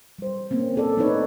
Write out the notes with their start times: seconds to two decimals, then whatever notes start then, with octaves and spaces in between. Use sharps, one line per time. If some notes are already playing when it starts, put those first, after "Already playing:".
0.19 G3 C5
0.51 A#3 C4 C#4
0.76 C4 A4 D5
0.97 A3 C4 D#4 B4 C#5